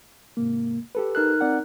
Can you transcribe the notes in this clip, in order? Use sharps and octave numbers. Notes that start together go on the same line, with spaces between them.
G#2 C3 A#3
G4 A4 B4
D#4 A#4 F#6
C4 D5 F#5